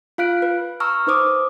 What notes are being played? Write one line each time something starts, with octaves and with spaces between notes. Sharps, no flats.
F4 F5 F#6 D7
B4
A#5 C#6 E6 F6
D#4 B4 C5 D6 D#6